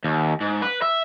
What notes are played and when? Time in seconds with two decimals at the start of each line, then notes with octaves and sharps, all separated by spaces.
0.04 D#2
0.41 G#2
0.62 B4
0.82 E5